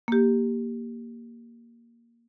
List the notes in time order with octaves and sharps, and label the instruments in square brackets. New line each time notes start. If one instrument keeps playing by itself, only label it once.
[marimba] A#3 G4